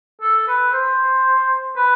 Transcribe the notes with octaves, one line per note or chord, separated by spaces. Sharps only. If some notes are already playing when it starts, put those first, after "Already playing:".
A4
B4
C5
B4